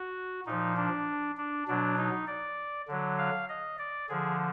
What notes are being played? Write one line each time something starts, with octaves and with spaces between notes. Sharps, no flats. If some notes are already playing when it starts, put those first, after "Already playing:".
Already playing: F#4
A#2 F3 D#4
D4
D4
B2 F#3 D4
D#4
D5
D3 F#3
F5
D#5
D5
D3 F3 G#4